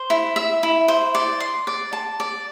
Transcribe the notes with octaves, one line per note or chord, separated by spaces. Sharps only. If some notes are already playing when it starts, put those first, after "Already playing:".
Already playing: C5
E4
E5
E4
C5
D5
C6
D5
A5
D5